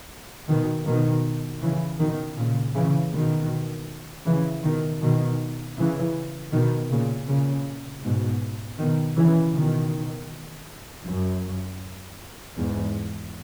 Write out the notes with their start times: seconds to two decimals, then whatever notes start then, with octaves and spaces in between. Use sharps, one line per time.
0.48 B2 D#3
0.86 B2 D#3
1.61 C#3 E3
1.99 B2 D#3
2.36 A#2 C#3
2.74 C#3 E3
3.12 B2 D#3
4.25 C#3 E3
4.63 B2 D#3
5.01 B2 D#3
5.77 C#3 E3
6.52 B2 D#3
6.90 A#2 C#3
7.27 A#2 C#3
8.03 G#2 B2
8.78 B2 D#3
9.16 C#3 E3
9.54 B2 D#3
11.05 F#2
12.56 E2 G#2